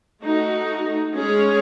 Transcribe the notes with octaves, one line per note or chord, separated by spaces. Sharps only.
A3 D#4 F#4
G#3 C#4 G#4 C#5